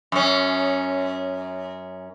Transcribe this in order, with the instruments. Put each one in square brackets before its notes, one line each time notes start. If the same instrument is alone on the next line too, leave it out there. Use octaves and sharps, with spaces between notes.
[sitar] F#2 C#4